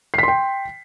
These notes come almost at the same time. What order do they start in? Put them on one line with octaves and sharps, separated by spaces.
C7 B6 C6 G5